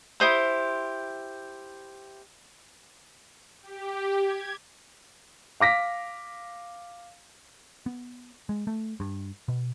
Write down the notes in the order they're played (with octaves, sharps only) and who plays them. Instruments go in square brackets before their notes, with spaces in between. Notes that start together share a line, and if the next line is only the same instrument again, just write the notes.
[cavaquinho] E4 G4 C5 D#6
[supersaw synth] G4
G#6
[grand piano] F5 D6 A#6 B6
[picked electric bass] B3
G#3
A3
G2
B2